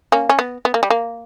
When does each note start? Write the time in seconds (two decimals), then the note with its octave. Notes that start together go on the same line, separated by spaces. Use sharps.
0.12 A#3 C#4
0.29 C#4
0.39 B3
0.65 B3
0.74 A#3
0.83 G3
0.90 A#3